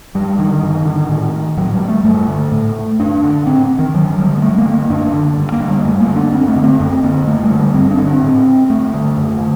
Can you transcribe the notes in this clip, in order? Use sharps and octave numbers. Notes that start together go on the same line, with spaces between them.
F#2 G3
D3 D#3
G2
D3
A2
A2 F#3
G3
A3
G2 A3
D3
A2
F#2 D4
D3
A2 C4
D#3
G2 F#3
D3 G3
A#3
G2 A3
A#3
D3
A#3
F#2 D4
D3
G2
A#3
D3
G3
F#2 A3
A#3
D3
D4
F#2 C4
A3
D3
C4
F#2 C4
D3 A#3
F#2 A3
G3
D3
G3
G2 C4
D4
D3
C4
A2
G2 A3
D3
F#2
D3